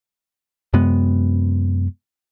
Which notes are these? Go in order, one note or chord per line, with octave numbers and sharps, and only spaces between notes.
F#2 C3 G#3 B3